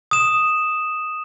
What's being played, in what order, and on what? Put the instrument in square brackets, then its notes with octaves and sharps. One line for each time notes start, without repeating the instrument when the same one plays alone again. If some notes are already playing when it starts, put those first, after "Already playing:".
[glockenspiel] D#6 E7